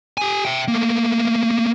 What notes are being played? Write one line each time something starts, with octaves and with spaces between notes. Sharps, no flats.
G4 G#5
E5 G5
A3 A#3